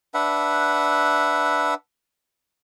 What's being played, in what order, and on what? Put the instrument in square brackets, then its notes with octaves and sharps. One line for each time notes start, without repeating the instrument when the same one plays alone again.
[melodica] D4 B4 E5 F#5